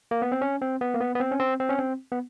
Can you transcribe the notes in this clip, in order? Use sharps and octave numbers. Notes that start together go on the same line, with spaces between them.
A#3
B3
C4
C#4
C4
B3
A#3
B3
B3
C4
C#4
C4
C4
C#4
C4
B3